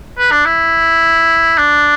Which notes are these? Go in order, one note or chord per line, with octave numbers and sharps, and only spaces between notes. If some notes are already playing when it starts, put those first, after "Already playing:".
B4
D4
E4
D4